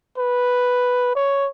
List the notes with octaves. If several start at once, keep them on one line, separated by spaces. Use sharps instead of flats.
B4
C#5